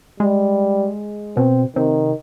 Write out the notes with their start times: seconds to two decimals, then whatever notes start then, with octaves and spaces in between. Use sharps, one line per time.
0.20 G3 G#3
1.37 B2 C4
1.76 C3 D#3